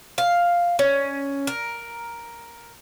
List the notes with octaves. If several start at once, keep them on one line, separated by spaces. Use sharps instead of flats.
F5
C#4
A#4